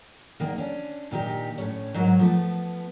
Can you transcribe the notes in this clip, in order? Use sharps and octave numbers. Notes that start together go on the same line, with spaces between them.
E2 D#3 A#3
C#4 D4
A#2 D#3 D#4 G4
A2 C#4 C#5
G#2 F#3 D#4 F#4 A#4
F3 A3 B3